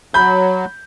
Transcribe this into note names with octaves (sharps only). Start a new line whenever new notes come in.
F#3 B5 G6